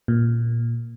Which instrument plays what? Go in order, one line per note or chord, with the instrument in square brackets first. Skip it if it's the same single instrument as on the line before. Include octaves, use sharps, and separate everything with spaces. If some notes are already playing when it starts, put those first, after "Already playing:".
[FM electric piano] A#2